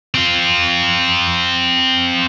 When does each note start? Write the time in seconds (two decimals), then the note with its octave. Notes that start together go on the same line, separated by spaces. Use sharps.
0.14 C4 F4